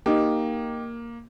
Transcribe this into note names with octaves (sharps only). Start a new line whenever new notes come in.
A#3 D#4 G4